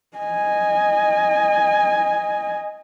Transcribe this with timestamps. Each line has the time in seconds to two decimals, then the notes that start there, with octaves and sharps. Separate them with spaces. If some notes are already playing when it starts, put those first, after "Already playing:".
0.17 D#5 G#5